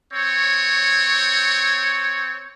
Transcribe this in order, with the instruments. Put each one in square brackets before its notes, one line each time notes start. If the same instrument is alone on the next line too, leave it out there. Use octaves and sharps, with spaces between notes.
[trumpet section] C4 C#5